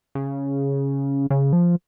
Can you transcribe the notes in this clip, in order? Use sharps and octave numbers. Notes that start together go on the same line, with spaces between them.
C#3
C#3
F3